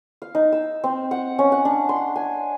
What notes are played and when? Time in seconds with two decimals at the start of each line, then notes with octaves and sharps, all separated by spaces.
0.22 F5
0.35 D#4
0.52 E6
0.84 C4
1.11 F#5
1.39 C#4
1.52 F#5
1.65 D4
1.89 C6
2.16 G#5